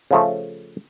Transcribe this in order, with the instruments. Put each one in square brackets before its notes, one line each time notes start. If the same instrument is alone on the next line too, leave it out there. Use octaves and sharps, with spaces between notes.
[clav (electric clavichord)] C#3 F3 A3